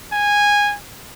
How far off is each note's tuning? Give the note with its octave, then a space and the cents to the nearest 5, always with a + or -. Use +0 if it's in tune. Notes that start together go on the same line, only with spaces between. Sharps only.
G#5 -15